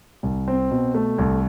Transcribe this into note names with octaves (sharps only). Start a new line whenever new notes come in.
C2
C4
B2
A3
C2